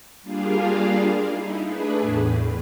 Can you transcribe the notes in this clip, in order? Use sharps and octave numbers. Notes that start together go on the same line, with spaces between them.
G3 A#3 D4 F4 G#4 F5
D#4 E4
A3 D4 G#4 B4
E2 A2